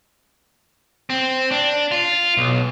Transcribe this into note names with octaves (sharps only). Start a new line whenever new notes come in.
C4
D4
F4
B1